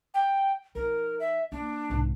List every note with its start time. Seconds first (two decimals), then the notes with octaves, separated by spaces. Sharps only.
0.14 G5
0.75 F3 D#4 A#4
1.20 E5
1.52 A#3 D4
1.90 C2 G#2